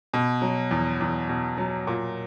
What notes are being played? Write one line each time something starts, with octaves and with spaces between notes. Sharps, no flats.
B2
F#3
E2
E2
B2
F#3
A#2